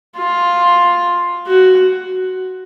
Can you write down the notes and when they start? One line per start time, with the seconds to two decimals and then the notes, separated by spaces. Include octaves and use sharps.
0.17 F4
1.47 F#4